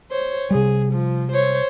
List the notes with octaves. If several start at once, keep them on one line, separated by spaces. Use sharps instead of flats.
C5 C#5
C3 G3 G#4
F3
C5 C#5